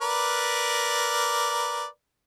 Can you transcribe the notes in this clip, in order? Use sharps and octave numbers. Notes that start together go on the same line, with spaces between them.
A#4 B4 D5